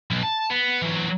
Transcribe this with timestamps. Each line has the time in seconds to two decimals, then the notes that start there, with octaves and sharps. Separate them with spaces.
0.11 B1
0.23 A5
0.50 B3
0.82 E3 F#3